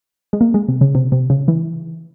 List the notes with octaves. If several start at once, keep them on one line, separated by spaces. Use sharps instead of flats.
G#3
A#3
G#3
C3
C#3
C3
C3
C#3
E3